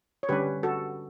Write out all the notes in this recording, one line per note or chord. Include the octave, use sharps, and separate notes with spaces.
C#5
D3 G3 C#4 G4 B4
F#4 A4